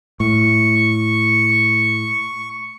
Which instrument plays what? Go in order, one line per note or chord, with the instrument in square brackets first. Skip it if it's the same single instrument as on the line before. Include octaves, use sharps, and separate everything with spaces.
[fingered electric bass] A2 [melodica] C#6